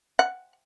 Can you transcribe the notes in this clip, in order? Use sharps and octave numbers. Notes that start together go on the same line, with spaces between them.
F#5